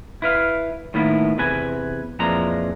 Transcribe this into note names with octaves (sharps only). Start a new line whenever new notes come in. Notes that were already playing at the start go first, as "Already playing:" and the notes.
E4 B4 F5
A2 D#3 A#3 B3 E4
E2 C3 B4 G#5
F2 A#2 E3 F3 G#3 A#5